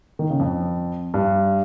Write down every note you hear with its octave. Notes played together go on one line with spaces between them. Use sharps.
D#3
C#3
F2
G2